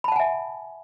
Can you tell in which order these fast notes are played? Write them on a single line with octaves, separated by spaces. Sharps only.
B5 A5 F#5 G#5 E5